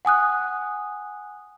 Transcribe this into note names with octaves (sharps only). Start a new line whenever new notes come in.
F#5 G#5 D#6 F#6